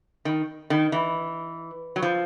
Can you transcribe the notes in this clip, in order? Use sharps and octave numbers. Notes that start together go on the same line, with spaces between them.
D#3
D#3
E3
F#3
F3